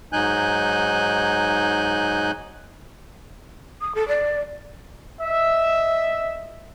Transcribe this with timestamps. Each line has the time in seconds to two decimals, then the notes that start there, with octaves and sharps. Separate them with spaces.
0.13 G#2 F#3 D#4 G#5 F#6 G6
3.81 D#6
3.95 A4
4.08 D5
5.21 D#5 E5